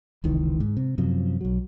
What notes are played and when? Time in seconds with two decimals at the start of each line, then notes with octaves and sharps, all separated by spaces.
0.24 F1 C#2 D#3 E3
0.60 G#2
0.77 C3
0.98 F#2 C3 F3
1.41 B1 F#3